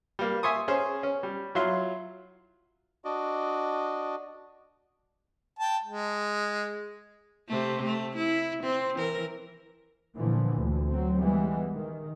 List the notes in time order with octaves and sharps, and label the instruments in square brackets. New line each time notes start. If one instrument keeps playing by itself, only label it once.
[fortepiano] G3 A#3
E5 G#5 C6 C#6 D#6
C#4 G#4 C5
C#4
G3
F#3 E4 F4 C6
[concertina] D4 F#4 D5 D#5
[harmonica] G5 A5
G#3
[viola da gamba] C3 A3
A3
E4
C4
E3 A#4
[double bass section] A#2 D3 E3 F3
D2
F#3 C4
E3 G3 G#3 B3
D#3